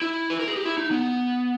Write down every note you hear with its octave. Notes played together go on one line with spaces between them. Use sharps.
E4
B4
A#4
G#4
G4
E4
D#4
B3